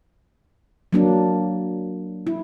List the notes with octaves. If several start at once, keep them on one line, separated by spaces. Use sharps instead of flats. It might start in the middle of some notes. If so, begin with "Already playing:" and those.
F#3 A#3 D4
E4